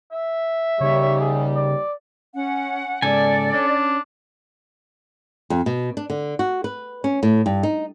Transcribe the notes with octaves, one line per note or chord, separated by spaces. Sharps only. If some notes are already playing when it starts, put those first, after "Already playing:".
E5
D#2 C#3 G3 C#5
G#4
D5
C#4 F#5
G#2 C#3 A4 D5 G#5
C#4 D4
F2
B2
D4
D3
F#4
B4
C#4
A2
G2
D#4